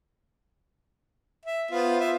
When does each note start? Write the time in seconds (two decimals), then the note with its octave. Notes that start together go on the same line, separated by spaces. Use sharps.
1.45 E5
1.71 B3 F4 C5
2.00 F4 E5